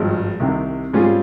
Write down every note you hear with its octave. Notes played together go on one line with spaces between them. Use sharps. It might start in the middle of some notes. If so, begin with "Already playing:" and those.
Already playing: G#1 G2 F3 G#3
C2 C3 D#3
G#2 G3 C#4 F4 G#4